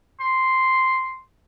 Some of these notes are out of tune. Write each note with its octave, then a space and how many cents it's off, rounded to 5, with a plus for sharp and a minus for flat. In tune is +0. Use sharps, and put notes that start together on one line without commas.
C6 -5